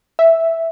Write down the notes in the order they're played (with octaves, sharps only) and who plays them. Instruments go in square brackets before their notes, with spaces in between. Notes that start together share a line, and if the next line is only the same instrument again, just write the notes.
[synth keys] E5